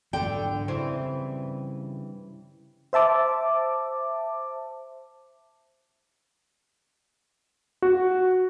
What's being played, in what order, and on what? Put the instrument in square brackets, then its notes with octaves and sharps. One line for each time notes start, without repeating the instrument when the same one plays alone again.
[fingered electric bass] G#2 E3 F#3 [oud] D3 [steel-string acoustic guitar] G5
[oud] G2 E3 C4 [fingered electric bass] C#3
[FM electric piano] C5 E5 A5 D6
[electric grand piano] F#4